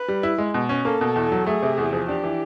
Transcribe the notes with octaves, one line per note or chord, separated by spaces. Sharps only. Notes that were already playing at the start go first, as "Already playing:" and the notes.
Already playing: B4
G3
E4
G#3
B2
C#4
A#3 A4
B2
E2
F#3
A3 G#4
C3
E2
F3
D4 G4
E3